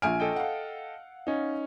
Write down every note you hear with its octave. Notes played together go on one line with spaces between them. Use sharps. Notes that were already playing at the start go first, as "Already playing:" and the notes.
A#1 G#5 F6 D7
A4 D#5 G5
F5 F#5
C#4 D#4